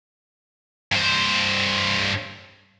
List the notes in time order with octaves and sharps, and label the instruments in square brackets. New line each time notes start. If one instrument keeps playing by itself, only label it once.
[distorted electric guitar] G2 C5